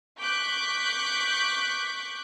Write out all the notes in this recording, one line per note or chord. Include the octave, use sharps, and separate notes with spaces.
C#6 D6 F#6 G6 B6